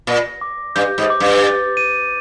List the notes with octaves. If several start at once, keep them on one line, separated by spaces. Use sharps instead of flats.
A#2 A#6
D6
G2 G6
G#2
D6
G2
A6
D#7